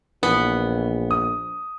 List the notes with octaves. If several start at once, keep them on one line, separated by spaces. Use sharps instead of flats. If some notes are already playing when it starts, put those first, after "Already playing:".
A#1 E3 B3
D#6